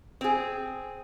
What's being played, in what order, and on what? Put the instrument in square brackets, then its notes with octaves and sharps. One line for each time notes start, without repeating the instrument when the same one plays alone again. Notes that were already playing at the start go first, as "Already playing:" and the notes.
[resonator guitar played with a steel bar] C4 G#4